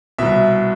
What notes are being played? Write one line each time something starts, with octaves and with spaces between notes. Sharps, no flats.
C2 B2 E5